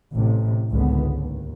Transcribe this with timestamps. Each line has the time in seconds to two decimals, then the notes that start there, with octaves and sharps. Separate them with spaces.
0.13 A1 A2 C3
0.70 G#1 C#2 D3 B3
1.12 D#2